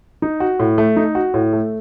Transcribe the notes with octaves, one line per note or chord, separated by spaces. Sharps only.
D#4
F#4
A2
A3
D#4
F#4
A2
A3